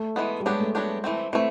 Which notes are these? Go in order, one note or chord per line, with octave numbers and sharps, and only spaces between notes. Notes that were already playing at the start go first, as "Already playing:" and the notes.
Already playing: A3
E3 G#3 B3
G3
F#3 G#3 B3 D4 G4
A3
F#3 B3 D4 G4
E3 A3 C4
E3 A3 C4